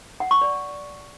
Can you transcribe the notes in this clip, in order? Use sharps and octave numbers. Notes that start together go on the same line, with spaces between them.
F#5
C#6
D5